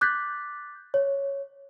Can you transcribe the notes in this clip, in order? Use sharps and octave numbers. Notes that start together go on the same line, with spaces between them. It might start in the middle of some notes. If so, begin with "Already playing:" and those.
D6 F#6 G6 A6 B6
C#5